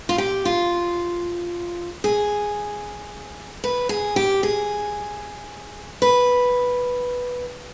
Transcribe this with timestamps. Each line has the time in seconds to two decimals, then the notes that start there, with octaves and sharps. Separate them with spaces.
0.09 F4
0.18 G4
0.45 F4
2.04 G#4
3.64 B4
3.89 G#4
4.16 G4
4.43 G#4
6.02 B4